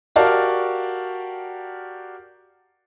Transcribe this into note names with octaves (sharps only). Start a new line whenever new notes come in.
F#4 G4 A#4 D5 F5 A5